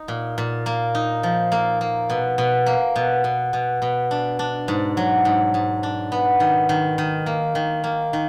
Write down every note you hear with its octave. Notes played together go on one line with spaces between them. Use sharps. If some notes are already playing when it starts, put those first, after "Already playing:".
Already playing: D#4
A#2
A#2
A#3
D#4
F3
A#3
A#3
B2
B2
A#3
B2
B2
B2
B2
D4
D4
G#2
F#3
G#2
G#2
D4
B3
D#3
D#3
D#3
A#3
D#3
A#3
D#3